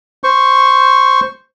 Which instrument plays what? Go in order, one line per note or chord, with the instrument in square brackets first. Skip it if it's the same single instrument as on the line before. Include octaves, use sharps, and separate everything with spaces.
[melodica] C5 C#6